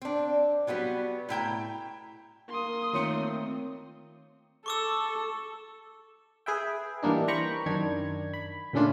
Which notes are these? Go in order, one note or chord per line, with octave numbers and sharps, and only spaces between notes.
C4 D4
F#3 G3 B3 F4 F#4
A2 E4 G5 A#5
A#3 C6 D#6
D#3 A3 C4 F4 C#5 C#7
A4 C#6 D6 E6
G#4 B4 E5 G5
E3 G3 A#3 D4 D#4
C5 G5 A#5 B5 C#6
F#2 D#3 D4 G#6
B5
A#2 C#3 A3 C#4 D4 F4